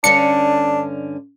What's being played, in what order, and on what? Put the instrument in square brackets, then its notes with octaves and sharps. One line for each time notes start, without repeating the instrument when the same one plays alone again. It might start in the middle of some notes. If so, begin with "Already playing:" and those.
[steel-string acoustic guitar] G2 D3 C#4 [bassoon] D4 [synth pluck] C#7